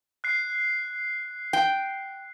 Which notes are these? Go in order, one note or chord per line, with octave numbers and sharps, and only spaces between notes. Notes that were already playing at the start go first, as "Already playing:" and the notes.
F#6 C7
G5